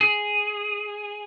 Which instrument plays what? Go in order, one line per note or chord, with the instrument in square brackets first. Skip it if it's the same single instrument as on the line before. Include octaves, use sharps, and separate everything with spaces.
[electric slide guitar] G#4